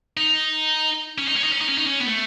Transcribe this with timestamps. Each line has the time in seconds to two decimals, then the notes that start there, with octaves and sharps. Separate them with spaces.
0.17 D#4
1.18 C#4
1.28 D#4
1.36 C#4
1.44 D#4
1.52 C#4
1.61 D#4
1.69 C#4
1.78 D#4
1.86 C#4
2.01 B3
2.06 A3